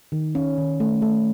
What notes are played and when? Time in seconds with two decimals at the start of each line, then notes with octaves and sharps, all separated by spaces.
0.12 D#3
0.35 C#4
0.58 D#3
0.80 A3
1.02 A3